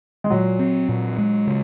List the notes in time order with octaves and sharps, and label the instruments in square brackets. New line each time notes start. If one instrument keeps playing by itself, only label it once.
[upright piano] G#3
[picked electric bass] A#2 [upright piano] F#3
[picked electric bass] C4
A#2
G#3
C#3